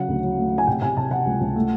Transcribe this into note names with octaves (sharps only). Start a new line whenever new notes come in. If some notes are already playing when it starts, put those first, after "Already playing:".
Already playing: C#3 F#3 F#5
D2
F#3
A3
C#3
G#5
C3 G5
C3 G#5
C3 A5
C3 F#5
C#2
C#2
A3